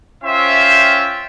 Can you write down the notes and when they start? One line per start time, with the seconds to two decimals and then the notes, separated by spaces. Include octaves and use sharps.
0.24 C#4 F4 C5 E5 G5